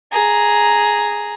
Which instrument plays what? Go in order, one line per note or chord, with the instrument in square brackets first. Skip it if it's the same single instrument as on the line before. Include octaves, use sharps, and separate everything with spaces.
[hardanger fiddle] G#4 A#5